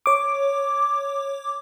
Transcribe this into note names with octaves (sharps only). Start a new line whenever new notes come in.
C#5 D6